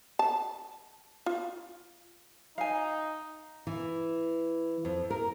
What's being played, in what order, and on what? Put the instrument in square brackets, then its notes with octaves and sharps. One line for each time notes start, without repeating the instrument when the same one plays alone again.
[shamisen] A5
F4
[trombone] D#4 [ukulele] F5 G#5
[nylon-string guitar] E3
F2
A#4